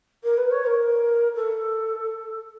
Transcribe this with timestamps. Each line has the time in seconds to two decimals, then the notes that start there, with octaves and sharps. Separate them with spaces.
0.23 A#4
0.37 B4
0.51 C#5
0.65 A#4
1.35 A4